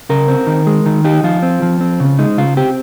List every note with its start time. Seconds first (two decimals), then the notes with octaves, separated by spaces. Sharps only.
0.09 C#3 A#4
0.28 C4
0.47 D#3
0.67 G#3
0.86 D#3
1.04 D#4 G4
1.23 F3 F4
1.42 C4
1.62 F3
1.81 C4
2.00 C#3
2.19 G#3 D#4
2.38 C#3 F4
2.57 C4 G4